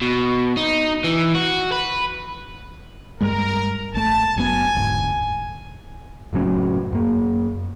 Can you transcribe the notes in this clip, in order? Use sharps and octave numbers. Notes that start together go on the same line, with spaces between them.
B2
D#4
E3
F#4
B4
G2 G3 G#3 A#4
A1 A3 A5
G1 F#2 B3 G#5
E1 D2 G#2
F#1 A2 F#3 C#4
F#2 A#3